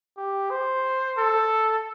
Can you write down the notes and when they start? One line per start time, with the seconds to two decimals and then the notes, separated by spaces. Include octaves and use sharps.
0.17 G4
0.51 C5
1.18 A4